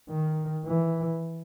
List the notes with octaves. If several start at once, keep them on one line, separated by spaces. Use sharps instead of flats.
D#3
E3